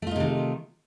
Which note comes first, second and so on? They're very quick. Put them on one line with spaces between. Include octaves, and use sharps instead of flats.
A3 F4 D#4 C3 D#3